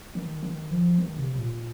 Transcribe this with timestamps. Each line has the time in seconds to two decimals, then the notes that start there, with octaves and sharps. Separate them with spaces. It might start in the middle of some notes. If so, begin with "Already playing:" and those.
0.15 D#3
0.43 D#3
0.71 F3
0.98 D#3
1.17 C3
1.35 A#2